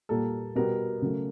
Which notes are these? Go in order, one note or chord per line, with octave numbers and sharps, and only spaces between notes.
A#2 G3 A#3 A4
B2 G3 B3 A#4
C#3 F#3 A3